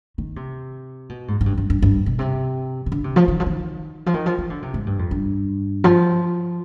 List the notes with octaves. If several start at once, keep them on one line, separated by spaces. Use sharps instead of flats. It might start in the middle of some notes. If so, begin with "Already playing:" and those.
D#3
C3
B2
G#2
G#2
G2
G2
G2
G2
B2
C3
C3
D3
C3
F3
D#3
F3
D#3
F3
D#3
F3
F3
D3
C3
G#2
G2
F2
G2
F3